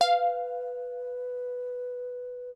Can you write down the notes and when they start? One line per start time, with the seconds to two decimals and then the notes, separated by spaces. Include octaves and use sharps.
0.01 B4 F5